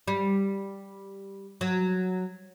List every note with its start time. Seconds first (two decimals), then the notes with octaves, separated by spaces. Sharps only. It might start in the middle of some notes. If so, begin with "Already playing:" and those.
0.07 G3
1.61 F#3